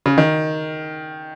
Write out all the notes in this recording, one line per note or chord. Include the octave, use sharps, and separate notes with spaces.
C#3
D#3